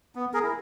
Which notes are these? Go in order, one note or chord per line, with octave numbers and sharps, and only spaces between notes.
B3
G#4 A#4
E4